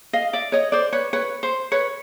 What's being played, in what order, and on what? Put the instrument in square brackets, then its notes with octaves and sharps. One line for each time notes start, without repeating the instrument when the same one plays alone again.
[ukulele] D#5 F5
D5 E5
C#5 D#5
C5 D5
B4 C#5
B4 C#5
C5
B4 C#5